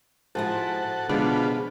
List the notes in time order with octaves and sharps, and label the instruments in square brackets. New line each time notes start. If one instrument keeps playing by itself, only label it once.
[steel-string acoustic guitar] G#2 F3 E4 [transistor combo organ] F#4 A4
[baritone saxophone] B2 [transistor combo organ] D3 F4 B4 [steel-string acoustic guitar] F3 G#3 [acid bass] D4